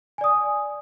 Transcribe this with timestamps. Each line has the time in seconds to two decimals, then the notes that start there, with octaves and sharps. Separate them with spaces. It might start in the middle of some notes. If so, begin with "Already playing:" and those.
0.18 G#5
0.21 D5
0.24 D#6